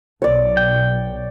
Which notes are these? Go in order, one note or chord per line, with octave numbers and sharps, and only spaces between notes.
B1 C#5 D5
G5